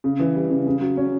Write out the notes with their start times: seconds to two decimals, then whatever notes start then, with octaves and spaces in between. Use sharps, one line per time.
0.04 C#3
0.19 E3
0.35 G3
0.51 C#3
0.67 C#3
0.81 F#3
0.97 C#4